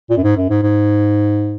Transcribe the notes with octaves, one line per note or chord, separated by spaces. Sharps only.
A#2
F#2
G#2
F#2
G#2
G#2